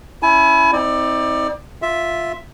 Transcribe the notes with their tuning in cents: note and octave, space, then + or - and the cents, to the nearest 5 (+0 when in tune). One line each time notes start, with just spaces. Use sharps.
C#4 +0 E4 +0 G#5 +40
C4 +0 D#4 +45 D5 +20
F4 +0 E5 +0